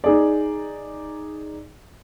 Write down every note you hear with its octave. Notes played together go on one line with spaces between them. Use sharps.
D#4 G#4 D5